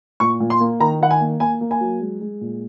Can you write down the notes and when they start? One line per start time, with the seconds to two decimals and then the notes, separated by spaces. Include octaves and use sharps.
0.20 A#2 C#6
0.40 A#2
0.50 C6
0.60 A#3
0.80 D#3 A#5
1.01 D#3 F#5
1.11 G#5
1.21 A#3
1.40 A#3 G#5
1.61 A#3
1.71 G#5
1.80 F#3
2.01 G#3
2.21 G#3
2.41 A#2